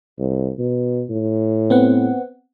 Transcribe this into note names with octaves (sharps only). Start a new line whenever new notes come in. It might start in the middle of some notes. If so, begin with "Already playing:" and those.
C2
B2
A2
B3 C4 F#5